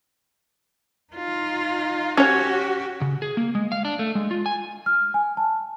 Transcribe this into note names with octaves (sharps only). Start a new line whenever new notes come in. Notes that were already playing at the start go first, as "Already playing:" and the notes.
D#4 F4
C#4 F#4 G4 C#5
C#3
G#4
A#3
G#3
F5
D4
A3
G#3
F4
G#5
F6
G#5
A5